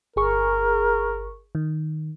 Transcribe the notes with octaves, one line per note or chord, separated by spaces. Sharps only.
G1 G#4 A#4 C#6
D#3